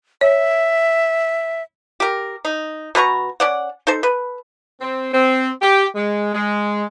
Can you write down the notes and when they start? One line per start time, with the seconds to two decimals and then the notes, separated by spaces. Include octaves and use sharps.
0.21 C#5 E5
2.00 G4 A#4
2.45 D#4
2.95 B2 B4 A#5 C#6
3.40 C#4 D5 F#5
3.87 D#4 A4 C5
4.03 B4
4.81 C4
5.13 C4
5.62 G4
5.95 G#3
6.33 G#3